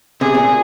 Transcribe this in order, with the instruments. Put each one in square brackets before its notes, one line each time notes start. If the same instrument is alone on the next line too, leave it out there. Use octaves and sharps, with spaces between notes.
[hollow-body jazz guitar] C3 [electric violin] G#4
[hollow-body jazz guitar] A#2